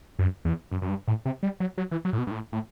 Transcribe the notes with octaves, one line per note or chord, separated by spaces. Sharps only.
F#2
E2
F#2
F#2
G2
A2
C3
G3
F#3
F#3
E3
F#3
A2
B2
G2
A2
A2